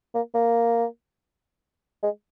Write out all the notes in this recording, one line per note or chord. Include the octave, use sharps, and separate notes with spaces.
A#3
A#3
G#3